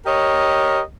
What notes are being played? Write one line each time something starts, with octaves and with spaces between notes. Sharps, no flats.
G4 A#4 C#5 D#5